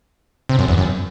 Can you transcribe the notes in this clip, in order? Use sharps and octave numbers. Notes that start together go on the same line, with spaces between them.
C3
F#2
E2
F#2